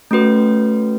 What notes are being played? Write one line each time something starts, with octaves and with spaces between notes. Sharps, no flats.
A3 C#4 F#4 B4